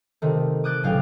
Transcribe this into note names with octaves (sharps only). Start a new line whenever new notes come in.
C3 D#3 A3
D6 D#6 F#6 G6 A6 D7
B1 A2 C#3 F#3 F5 G5